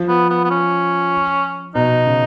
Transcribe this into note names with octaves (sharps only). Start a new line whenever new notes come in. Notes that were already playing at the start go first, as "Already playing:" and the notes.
Already playing: F3
B3
B3
B3
C#4
B2 D#4
C#3